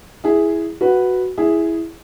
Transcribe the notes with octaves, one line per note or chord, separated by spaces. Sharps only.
E4 G#4
F#4 B4
E4 G#4